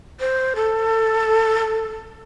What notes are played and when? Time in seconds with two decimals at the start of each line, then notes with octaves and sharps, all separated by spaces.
0.20 C5
0.56 A4